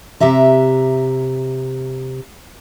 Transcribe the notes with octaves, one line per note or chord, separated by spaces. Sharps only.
C3 G4 E5 A#5